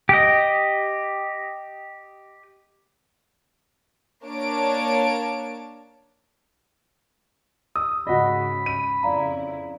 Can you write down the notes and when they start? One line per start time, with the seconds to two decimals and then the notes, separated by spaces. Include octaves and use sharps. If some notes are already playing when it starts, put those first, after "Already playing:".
0.09 G4 D#5
4.24 A#3 D4 C#5 A5 D7
7.76 D#6 E6
8.07 G#2 C#3 F#4 D#5 B5
8.66 D#7
9.03 F2 C#3 E4 D5 F5 A#5